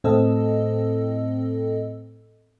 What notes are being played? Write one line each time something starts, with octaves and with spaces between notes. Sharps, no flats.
A2 C4 A4 D#5 E6